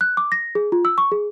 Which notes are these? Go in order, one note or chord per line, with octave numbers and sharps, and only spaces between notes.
F#6
D6
A#6
G#4
F4
E6
C#6
G#4